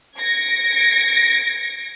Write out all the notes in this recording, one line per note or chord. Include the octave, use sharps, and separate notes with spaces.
G#6 A#6 C#7 D7